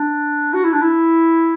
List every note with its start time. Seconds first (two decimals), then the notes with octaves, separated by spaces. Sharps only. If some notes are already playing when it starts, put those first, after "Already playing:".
Already playing: D4
0.54 F#4
0.64 E4
0.73 D4
0.82 E4